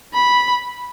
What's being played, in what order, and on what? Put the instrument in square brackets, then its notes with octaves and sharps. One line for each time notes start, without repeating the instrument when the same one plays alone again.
[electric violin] B5